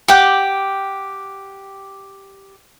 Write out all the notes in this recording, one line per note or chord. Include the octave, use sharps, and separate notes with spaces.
G4 F#5 G5 D6